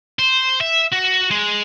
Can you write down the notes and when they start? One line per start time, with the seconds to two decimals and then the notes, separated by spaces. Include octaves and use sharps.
0.19 C5
0.61 E5
0.92 F#4
1.30 G#3